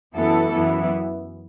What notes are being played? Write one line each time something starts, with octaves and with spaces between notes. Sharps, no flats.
F#2 E3 B3 E4 A4
F#2 E3 B3 E4